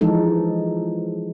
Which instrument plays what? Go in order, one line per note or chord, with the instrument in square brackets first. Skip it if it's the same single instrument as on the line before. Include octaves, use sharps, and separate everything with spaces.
[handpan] E3 F3 G#3 D#4 A4